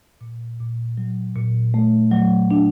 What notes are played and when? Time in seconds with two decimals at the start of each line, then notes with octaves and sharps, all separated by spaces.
0.21 A#2
0.60 A#2
0.97 F#3
1.36 A#2
1.74 A3
2.12 F#3
2.51 D4